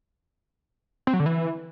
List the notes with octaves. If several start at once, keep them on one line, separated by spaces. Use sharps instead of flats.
C4
F#3
D3
E3